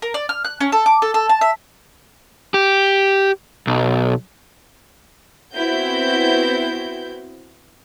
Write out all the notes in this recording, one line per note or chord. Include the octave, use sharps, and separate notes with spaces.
A#4
D5
F6
F#6
C#4
A4
D6
A4
A4
A5
E5
G4
B1
B3 C4 E4 F#4 G6